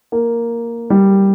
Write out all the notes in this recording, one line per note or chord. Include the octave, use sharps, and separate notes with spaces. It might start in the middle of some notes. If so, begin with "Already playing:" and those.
A#3
G3